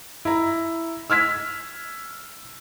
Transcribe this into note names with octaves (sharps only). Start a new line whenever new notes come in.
E4 A#5
E6 F6 G#6 B6